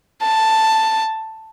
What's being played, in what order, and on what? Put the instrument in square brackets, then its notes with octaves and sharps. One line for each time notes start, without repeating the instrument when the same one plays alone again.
[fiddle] A5